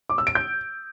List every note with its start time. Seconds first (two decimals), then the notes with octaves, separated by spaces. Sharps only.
0.10 D6
0.18 E6
0.27 D7
0.35 G6